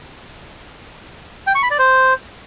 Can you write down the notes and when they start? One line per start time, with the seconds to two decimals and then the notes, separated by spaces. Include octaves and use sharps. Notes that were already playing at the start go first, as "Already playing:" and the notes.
1.47 G5
1.55 C#6
1.63 B5
1.71 D5
1.79 C5